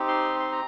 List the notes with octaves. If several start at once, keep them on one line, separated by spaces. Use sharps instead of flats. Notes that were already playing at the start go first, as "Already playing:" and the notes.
Already playing: C4 D#4 G4
C6
C6
A#5